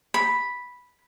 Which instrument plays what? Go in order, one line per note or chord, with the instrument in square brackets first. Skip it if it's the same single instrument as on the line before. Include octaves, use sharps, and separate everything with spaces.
[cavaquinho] B5